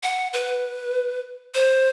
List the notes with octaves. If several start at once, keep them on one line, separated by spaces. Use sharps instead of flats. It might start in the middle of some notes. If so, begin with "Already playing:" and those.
F#5
B4
C5